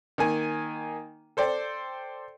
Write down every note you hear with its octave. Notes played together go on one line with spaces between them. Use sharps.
D#3 A#3 G#5
A4 C5 D5 G5